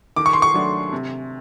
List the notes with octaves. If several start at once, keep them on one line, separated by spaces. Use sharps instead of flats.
D#3 D6
C#6
C6
C#6
F#3 A3 D4
C3